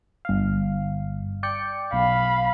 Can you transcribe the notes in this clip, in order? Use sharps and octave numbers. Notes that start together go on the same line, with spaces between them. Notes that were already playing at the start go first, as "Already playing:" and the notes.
G1 F5
D5 G5 C#7
B1 F5 B5